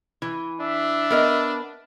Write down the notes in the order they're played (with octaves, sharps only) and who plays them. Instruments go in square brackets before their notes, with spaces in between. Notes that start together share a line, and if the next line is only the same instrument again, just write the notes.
[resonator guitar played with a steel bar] E3
[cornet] D4 [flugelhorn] E5
[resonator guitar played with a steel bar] B3 A#4 D#5